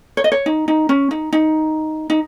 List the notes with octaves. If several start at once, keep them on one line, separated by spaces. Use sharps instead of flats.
C#5
D#5
C#5
D#4
D#4
C#4
D#4
D#4
D#4